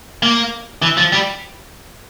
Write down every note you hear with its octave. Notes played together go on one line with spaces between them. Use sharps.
A#3
E3
F3
G3